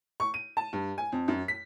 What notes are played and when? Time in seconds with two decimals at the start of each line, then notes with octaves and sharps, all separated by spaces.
0.20 C#6
0.34 D#7
0.57 A5
0.73 G2
0.98 G#5
1.12 F2
1.28 F#2
1.48 B6